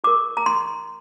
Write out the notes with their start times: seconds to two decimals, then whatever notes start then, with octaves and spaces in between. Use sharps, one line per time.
0.04 F4 A#4 D6
0.37 A#5
0.46 C6